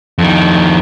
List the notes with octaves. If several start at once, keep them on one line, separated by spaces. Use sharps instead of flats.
F2 D#3